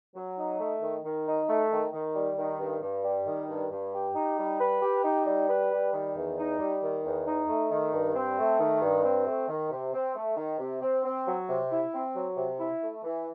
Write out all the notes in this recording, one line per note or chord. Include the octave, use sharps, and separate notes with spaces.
F#3
D#4
A3
D#3
D#3
D#4
A3
D#3
D#3
G3
D#3
G2
G2
G3
D#3
G2
G2
G4
D#4
G3
B4
G4
D#4
G3
B4
G3
D#3
E2
D#4
G3
D#3
E2
D#4
A3
D#3
G2
C4
A3
D#3
G2
C4
A3
D#3
C3
C4
A3
D#3
C3
C4
C4
F#3
C3
E4
C4
F#3
C3
E4
A3
E3